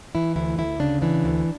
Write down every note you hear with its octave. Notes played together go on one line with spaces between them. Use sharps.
E3 E4
D2 E4
D2 E4
C#3 D4
E3 D4
D2